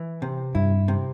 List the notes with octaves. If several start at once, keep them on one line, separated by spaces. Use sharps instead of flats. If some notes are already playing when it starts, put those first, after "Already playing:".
Already playing: E3
C3
G2 E4
C3